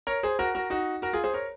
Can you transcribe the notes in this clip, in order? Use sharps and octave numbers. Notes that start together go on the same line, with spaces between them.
A#4 C#5
G#4 C5
F#4 A#4
F#4 A#4
D#4 F#4
F#4 A#4
F4 G#4
G#4 C5
A#4 C#5